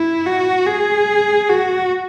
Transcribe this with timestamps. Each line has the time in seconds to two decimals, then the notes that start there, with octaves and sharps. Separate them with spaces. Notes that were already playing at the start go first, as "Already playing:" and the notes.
Already playing: E4
0.26 F#4
0.67 G#4
1.49 F#4